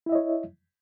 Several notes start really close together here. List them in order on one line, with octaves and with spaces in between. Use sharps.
E4 E5 D#5 C#5